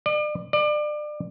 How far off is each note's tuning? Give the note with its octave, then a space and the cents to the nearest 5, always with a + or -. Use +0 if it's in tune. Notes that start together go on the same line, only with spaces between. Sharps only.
D5 +40
D5 +30